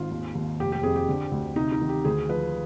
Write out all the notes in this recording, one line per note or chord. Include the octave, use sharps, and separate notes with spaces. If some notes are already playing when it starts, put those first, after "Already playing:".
Already playing: G#1 G#2 F4
D#2
D#2
F1 G4
G4
F2 G#4
G4
D3
D2
C3 D#4
D#4
D#3
G4
D2 G#4
F3 B4